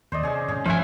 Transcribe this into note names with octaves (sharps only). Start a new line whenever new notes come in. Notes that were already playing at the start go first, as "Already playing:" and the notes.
D#2 C5 D5 D#5
C3 C#4 G#4
G#2 C#4 C#5
G1 D2 B2 F3 C5 E5 F#5 G#5